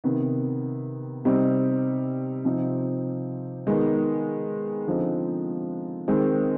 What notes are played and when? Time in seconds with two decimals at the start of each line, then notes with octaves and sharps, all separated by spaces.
0.04 C3 D#3 B3
1.25 C3 G3 C4 D#4
2.45 C3 F3 C4 D#4
3.67 D#3 G#3 B3 D#4
4.87 D3 F3 C4 D#4
6.08 D#3 G#3 C4